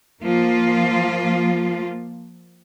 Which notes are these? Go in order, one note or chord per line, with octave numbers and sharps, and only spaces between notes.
F3 A#3 F4